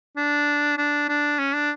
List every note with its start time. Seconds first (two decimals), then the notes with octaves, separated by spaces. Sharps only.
0.17 D4
0.78 D4
1.09 D4
1.39 C#4
1.54 D4